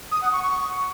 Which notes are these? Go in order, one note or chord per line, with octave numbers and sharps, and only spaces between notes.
D#6
F#5
C#6
C#6